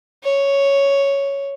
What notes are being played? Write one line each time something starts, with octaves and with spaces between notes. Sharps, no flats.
C#5